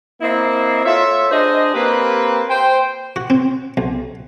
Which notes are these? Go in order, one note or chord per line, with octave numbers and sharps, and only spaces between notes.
A#3 C4 E4 D#5 E5
F4 A4 C#5 E5
D4 G#4 C5 D#5
A#3 C4 G4 B4
C5 G5
F#4
C4
B1